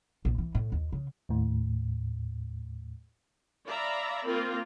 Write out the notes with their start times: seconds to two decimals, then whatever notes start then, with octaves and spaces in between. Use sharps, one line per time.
0.25 A#1
0.38 E3
0.55 A2
0.72 D#2
0.92 C#3
1.29 D#2 A2
3.66 D5 E5 F5 A#5 B5
4.27 A#3 C4 F4 A#4